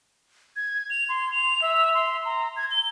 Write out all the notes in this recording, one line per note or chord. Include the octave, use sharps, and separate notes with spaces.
G#6
F7
C6
F7
E5
C6
A#5
G#6
G7